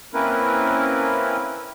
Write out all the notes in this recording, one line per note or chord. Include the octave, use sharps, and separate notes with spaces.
A#3 C4 C#4 E4 A#4 B4